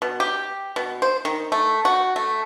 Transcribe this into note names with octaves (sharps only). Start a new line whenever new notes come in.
B2
G4
B2
C5
D#3
A3
F#4
A3